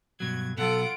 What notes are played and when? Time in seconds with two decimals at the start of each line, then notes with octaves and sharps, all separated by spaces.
0.20 G2 B2 F#3 G#6
0.58 B2 F#3 F4 A4 F#5 D7